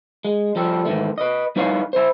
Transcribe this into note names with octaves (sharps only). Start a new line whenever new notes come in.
G#3
F3 G3 A4
G#2 D#3 E3 A3
B4 D#5
G3 D#4 E4 B4 C#5 F5
E4 C5